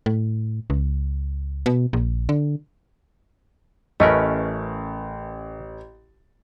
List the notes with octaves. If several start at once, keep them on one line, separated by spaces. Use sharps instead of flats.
A2
C#2
B2
A#1
D3
A1 A3 C#4 A#4 B4 D#5